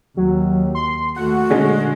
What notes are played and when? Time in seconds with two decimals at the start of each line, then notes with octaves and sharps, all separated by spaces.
0.17 D#2 F#3
0.75 C6
1.16 D#2 A3 F#4 F#5
1.50 A#2 D3 G#3 C#4